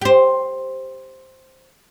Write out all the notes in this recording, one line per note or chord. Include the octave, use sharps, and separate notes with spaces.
G4 C5